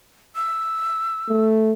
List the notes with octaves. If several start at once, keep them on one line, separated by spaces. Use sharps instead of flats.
E6
A3